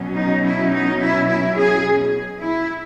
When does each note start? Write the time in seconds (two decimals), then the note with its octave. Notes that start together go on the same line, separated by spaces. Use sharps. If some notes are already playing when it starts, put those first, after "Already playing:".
Already playing: B2 F#3 C#4
0.16 D#4
0.44 E4
0.72 D#4
1.00 E4
1.28 E4
1.57 G#4
2.42 E4